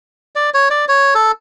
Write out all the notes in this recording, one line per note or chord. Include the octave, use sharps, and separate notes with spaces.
D5
C#5
D5
C#5
A4